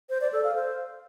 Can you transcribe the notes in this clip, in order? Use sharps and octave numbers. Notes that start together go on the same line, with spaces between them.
C5
D5
A4
F5
C5